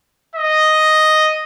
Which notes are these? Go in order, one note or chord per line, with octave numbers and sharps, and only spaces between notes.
D#5